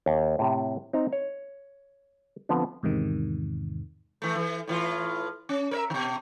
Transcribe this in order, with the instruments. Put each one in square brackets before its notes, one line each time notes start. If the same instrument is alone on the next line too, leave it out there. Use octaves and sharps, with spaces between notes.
[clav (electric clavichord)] D#2
A2 C3
C4 D#4 A#5
C#5
D3 F3 B3 C4
[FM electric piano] E2 G#2 C3 D#3
[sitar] E3 A3
E3
A2 E3 F4
C#4
A#4 C#5 E5
B2 D#3